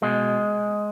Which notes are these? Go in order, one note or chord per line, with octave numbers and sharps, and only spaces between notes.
B2 G#3